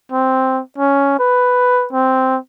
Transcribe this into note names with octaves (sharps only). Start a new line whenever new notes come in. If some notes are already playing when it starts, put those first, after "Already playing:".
C4
C#4
B4
C4